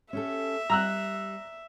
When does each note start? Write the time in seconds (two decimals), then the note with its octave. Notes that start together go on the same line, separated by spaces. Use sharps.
0.13 C#4 G4 A4 E5
0.70 G3 A#5 E6 F#6